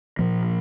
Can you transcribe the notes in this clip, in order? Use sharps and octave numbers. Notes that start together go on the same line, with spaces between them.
A#2 F3 A#3